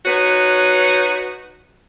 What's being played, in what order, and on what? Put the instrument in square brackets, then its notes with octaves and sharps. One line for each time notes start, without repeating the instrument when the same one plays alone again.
[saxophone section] D#4 F#4 B4 C#5